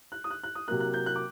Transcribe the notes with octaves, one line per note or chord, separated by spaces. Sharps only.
F#6
D#6
F#6
F#6
D#6
C3 F#3 A#3 F#6
F#6
G6
F#6
D6